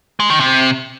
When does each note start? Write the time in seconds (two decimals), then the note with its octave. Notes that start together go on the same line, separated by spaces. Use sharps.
0.20 G#3
0.30 D#3
0.40 C3